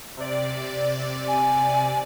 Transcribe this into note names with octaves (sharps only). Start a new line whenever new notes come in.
C3 D5
G#5